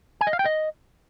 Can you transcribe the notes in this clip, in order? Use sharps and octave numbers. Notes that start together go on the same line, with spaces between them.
G#5
D#5
F5
G5
D#5